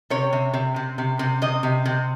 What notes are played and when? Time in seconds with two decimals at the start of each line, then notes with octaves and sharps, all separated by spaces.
0.10 C3 C#5
0.33 C3
0.54 C3
0.76 C3
0.98 C3
1.19 C3
1.42 C3 D#5
1.63 C3
1.86 C3